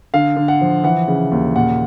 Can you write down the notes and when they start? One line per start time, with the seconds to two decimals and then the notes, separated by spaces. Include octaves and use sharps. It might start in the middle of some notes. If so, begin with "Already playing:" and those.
0.14 D3 F5
0.37 D3
0.48 F#5
0.61 F3
0.84 E3 F#5
1.08 C#3
1.32 D#2
1.55 A#2 F#5